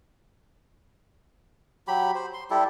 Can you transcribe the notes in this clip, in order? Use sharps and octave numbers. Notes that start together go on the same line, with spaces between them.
F#3 G4 B5
C5
C6
G3 E4 G4 A4